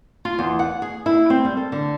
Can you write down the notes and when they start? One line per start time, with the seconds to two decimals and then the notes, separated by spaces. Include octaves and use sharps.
0.25 F4
0.39 E2
0.59 F#5
0.82 G#4
1.06 E4
1.30 C4
1.45 G3
1.57 A4
1.72 D3